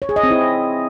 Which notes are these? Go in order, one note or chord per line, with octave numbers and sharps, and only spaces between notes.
C#5
G#4
D#5
C4
E4